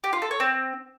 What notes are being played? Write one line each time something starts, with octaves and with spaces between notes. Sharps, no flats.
G4
F4
A4
C#5
C4